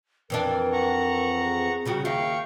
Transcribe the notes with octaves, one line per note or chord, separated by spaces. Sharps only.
F2 E3 D4 A#4
F#5 A#5 C#6
G#4
C#3 G3 F#4
D#2 E4 F5 G5 C#6